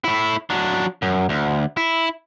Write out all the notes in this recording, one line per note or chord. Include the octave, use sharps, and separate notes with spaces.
A3 E4
F#3 D4
F#2
D2
E4